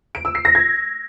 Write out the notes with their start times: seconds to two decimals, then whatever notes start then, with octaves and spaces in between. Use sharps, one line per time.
0.15 D7
0.25 E6
0.35 C7
0.45 A#6
0.55 G#6